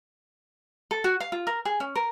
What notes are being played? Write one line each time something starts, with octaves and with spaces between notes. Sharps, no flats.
A4
F#4
F5
F4
A#4
G#4
C#4
A#4